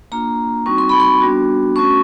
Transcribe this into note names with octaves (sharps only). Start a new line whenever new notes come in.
A#3 D4 F4 A#5
G3 C4 D#4 F#4 C#6
C6
B5
C6
G3 B3 D4 F#4
A3 C#4 F#4 C#6